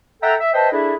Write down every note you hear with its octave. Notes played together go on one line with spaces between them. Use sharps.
A4 E5 F#5 G5 A#5
E5
B4 C5 D#5 E5 G5 A5
D4 E4 G#4 A4 D5 E5